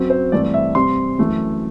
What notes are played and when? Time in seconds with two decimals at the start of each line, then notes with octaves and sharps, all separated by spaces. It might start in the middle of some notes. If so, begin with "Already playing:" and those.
Already playing: F#2 F#3 C4
0.10 C5
0.32 G2 E3 A3 C4 D5
0.54 E5
0.75 C3 G3 C4 C6
1.19 F#2 E3 A3